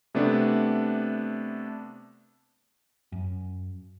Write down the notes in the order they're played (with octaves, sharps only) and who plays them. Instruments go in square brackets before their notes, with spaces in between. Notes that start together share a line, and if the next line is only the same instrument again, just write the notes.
[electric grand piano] C3 A3 B3 D4
[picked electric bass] F#2